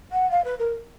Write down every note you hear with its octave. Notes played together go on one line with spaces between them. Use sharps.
F#5
F5
B4
A#4